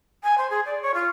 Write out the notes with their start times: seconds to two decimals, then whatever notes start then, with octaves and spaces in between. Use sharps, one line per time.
0.23 G#5
0.38 C5
0.50 G#4
0.66 D5
0.82 C#5
0.94 F4